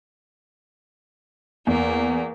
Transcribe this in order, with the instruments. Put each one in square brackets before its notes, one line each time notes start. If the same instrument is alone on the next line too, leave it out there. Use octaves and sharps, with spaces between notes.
[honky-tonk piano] E2 [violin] A#3